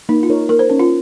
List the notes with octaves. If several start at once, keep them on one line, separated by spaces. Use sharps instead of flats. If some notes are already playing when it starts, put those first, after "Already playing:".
A#3 D#4
F4
D#4 A#4 C#5
A#3 A#4
C5
C#4 D#4 A#4 C#5
F4